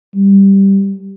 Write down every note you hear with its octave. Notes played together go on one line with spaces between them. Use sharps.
G3